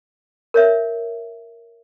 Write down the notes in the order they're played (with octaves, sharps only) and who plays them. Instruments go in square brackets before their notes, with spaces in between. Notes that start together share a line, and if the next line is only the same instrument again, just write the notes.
[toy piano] A#4 C#5 E5